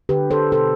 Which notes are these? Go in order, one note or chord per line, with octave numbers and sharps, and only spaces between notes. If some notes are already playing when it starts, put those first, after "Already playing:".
D3 G4 B4
A4 C5
B2 A4 C5